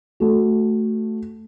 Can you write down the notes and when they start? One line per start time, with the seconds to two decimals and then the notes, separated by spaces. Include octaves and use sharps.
0.20 A3 F#4